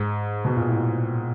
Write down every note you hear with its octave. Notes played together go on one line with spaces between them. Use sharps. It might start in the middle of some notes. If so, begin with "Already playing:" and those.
Already playing: G#2
B2
A#2
A2